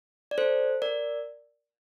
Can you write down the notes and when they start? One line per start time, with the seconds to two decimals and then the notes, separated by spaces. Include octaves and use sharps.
0.31 D5
0.38 A4 C5
0.82 A#4 D5